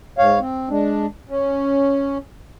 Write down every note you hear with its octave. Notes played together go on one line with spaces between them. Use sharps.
G#2 C#5 F5
C4
G#3 D4
C#4